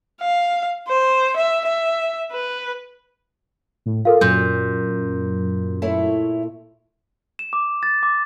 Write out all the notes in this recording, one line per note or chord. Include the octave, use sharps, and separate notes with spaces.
F5
C5
E5
E5
B4
A2
F4 A4 A#4 F5
F#2 A#2 G6
A3 E4 C#5
E7
D6
A6
D6